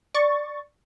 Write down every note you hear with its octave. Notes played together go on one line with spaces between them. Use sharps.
D5 C#6 A6